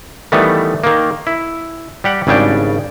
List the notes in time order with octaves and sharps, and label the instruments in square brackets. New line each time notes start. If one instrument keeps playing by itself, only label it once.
[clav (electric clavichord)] D#3 E3 G3 A3 B3
D#3 A#3
E4
G3 G4 F#5
G#1 C#3 G3 D4 G5